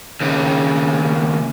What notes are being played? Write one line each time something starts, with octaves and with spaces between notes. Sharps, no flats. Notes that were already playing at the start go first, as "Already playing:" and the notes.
D#2 C#3